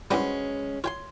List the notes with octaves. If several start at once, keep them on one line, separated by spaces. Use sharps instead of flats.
G2 E3 G3 G#3 C#4 F#4 B4 C5
F4 C#5 G5 C6